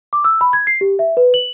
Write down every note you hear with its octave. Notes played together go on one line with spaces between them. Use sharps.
D6
E6
B5
G#6
C7
G4
E5
B4
F#7